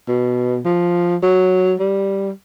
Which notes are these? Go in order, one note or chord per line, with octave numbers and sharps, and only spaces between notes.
B2
F3
F#3
G3